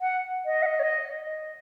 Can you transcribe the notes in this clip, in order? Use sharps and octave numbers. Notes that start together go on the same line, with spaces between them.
F#5
D#5
F#5
D#5
C#5
D#5